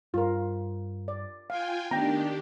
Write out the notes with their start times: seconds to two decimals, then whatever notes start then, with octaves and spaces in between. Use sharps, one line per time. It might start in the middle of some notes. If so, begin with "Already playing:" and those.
0.14 G2 F4 A#4
1.08 D5
1.50 F4 F5 G5 G#5
1.91 D#3 A3 B3 D4 G4 G5 A#5